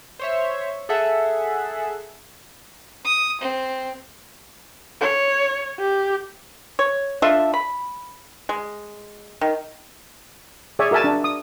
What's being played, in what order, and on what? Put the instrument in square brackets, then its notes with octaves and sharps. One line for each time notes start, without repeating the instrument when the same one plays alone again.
[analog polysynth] C5 C#5 E5
G#4 A4 E5 F#5
[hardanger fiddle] D#6
C4
[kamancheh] C#5
G4
[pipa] C#5
D4 F4 A4 E5
B5
G#3
D#3
[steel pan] G#4 C#5 D5 E5 G#5
F#4 A#4 E5 G#5 A5
D4
D#6